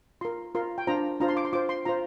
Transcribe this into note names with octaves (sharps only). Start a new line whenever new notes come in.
F4 A#4 C6
F4 A#4 C6
G5
D4 F4 C5 A#5
D4 F4 C5 A#5
C6
D6
C6
F4 C5 D6
C6
F4 C5 A#5